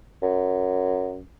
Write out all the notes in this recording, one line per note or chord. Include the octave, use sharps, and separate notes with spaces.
F#2